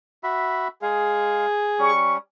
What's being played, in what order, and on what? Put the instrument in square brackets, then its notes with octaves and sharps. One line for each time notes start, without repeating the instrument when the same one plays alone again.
[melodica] F#4 E5 B5
[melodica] G#3 F5 [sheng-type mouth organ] G#4
[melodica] G3 C#4 [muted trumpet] C#6